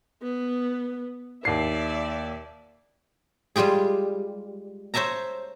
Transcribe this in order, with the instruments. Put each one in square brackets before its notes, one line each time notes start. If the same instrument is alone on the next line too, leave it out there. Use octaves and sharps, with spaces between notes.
[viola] B3
[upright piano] D#2 C7 [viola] D5 E5
[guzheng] G3 G#3 F4 G4 G#4
C5 C#5 E5 A5 A#5